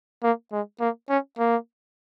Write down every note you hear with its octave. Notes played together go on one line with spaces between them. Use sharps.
A#3
G#3
A#3
C#4
A#3